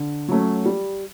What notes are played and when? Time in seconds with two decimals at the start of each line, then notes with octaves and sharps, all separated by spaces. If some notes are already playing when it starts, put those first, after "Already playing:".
Already playing: D3
0.29 F#3 A3 C#4
0.66 G3